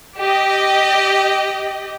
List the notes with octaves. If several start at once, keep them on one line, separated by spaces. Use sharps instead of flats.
G4 D#5